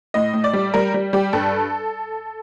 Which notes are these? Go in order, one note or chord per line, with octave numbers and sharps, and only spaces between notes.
A2 D#5
A2
D5
G3
G3 A#4
G3
G3 G4
G2 A4